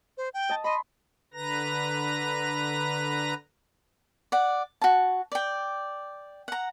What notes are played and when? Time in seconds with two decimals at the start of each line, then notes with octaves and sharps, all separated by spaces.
0.17 C5
0.34 G5
0.49 D#5 A5
0.64 D#5 B5 C6
1.34 D3 B4 A#5 A#6
4.32 D5 F#5
4.82 F#4 A5
5.32 D5 G5
6.48 F#5 A#5